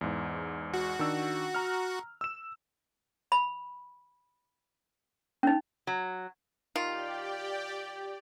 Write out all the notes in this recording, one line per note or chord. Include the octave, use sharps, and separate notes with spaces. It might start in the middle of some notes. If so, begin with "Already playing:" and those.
E2 G#2
F#4
D#3 D4 E6
A#5 F6
E6 E7
B5
C#4 D#4
F#3
D#3 F4 G4 D5 G5